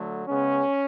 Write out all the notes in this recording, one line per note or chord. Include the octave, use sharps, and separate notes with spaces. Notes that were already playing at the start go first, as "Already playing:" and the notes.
Already playing: D3 F#3 A3
C#3 G#3 B3 C#4